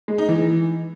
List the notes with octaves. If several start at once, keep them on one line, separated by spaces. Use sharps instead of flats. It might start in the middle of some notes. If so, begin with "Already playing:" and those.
G#3
D#4
E3